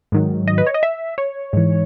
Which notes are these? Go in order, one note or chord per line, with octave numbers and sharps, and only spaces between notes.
G#2 D#3 F#3
D#5
B4
C#5
D#5
E5
C#5
G#2 E3